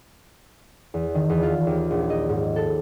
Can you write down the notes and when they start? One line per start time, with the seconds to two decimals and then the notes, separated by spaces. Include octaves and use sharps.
0.94 E2
1.15 D#3
1.29 E2
1.43 F4
1.67 D#2
1.91 A#1
2.10 D#5
2.29 G#2
2.56 A4